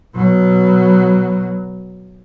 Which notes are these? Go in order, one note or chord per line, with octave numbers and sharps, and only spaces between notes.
B2 F#3